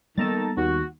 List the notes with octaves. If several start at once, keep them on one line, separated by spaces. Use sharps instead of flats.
D#3 G3 A#3 B3 A4 A5 A#5 A6
D#2 F#4